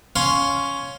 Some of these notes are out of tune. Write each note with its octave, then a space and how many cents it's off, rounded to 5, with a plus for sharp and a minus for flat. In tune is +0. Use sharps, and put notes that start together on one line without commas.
C#4 +5 F5 +10 C6 +0